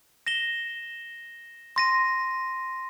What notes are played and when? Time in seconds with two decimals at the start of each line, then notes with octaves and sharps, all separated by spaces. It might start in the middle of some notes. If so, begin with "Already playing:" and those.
0.27 A#6 E7 G7
1.76 C6 A#6 D#7